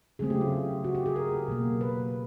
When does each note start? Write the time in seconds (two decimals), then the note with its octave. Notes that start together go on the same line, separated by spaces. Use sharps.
0.19 C#3 F#3 A3 C4 G#4
0.30 G4
0.41 F4
0.84 F#4
0.95 G4
1.06 G#4
1.16 A#4
1.48 B2 F#3 A#3
1.81 B4